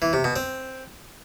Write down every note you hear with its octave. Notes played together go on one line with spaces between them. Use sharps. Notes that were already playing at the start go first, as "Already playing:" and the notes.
E3
C3
B2
C4